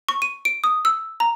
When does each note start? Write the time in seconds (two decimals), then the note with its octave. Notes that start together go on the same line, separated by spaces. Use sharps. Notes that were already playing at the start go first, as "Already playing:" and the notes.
0.09 C#6
0.22 D#7
0.45 D7
0.64 D#6
0.85 E6
1.20 A#5